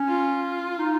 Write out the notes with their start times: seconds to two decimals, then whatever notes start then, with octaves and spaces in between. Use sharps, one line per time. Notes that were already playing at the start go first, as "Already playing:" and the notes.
Already playing: C#4
0.08 F4
0.79 D#4